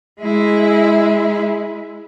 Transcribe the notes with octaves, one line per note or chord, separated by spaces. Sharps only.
G#3 E4